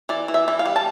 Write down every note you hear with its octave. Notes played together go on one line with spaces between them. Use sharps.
E3 D5
E3
E5
E3
F5
G3
A5